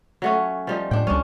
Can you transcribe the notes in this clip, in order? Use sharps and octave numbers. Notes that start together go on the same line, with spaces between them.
F#3 A3 C#4
F3 G3 D#4
A2 D4 G5
C#2 G3 C#4 D4